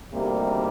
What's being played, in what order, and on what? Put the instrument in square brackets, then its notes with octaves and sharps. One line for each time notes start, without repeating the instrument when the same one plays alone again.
[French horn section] D2 C3 D#3 G3 A#3